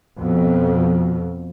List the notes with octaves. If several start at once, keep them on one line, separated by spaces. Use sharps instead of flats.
F2 B2